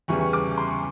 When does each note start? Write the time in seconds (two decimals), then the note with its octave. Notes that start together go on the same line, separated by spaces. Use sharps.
0.08 E2 C#3 E3 G3 C#6
0.21 C#6
0.33 D6
0.58 C6
0.70 C#6